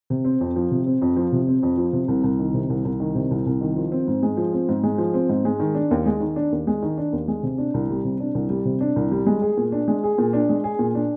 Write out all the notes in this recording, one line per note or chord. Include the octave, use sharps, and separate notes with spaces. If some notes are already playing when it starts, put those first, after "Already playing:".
C3
C4
F2
F3
C3
C4
F2
F3
C3
C4
F2
F3
C3
C2
C2
D#3
C3
C2
C2
D#3
C3
C2
C2
D#3
F3
C4
G#2
G#3
F3
C4
G#2
G#3
F3
C4
G#2
G#3
D#3
D4
D#2
G#3
D#3
D4
D#2
G#3
D#3
D4
D#2
G#3
C3
D4
C2
G3
C3
D4
C2
G3
C3
D4
C2
G3
G#3
G#4
A#2
D4
G#3
G#4
A#2
D4
G#3
G#4
A#2
D4